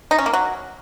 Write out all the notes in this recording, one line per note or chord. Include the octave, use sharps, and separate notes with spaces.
D#4
C#4
A#3
F#3